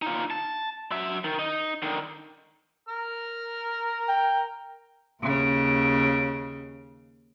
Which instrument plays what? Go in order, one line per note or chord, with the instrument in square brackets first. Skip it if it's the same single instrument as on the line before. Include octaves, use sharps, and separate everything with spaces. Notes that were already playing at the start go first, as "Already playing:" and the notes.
[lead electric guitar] D#4 F4
A5
F#3 E5
D#3
D#4
D3 D#3
[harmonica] A#4 A#5 F6
[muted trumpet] G5
[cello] D#2 C#3